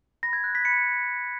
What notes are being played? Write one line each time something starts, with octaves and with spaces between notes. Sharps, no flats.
B5 A#6
G#6
F#6
B6
B5 C#7